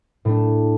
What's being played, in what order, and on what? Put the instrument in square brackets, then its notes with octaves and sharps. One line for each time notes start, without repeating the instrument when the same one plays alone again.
[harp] A2 A3 D4